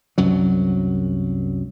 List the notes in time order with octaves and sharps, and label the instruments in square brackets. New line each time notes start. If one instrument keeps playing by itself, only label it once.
[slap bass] C2 F#2 F#3